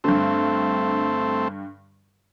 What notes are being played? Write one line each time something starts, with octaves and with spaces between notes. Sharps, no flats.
G2 D3 A3 C4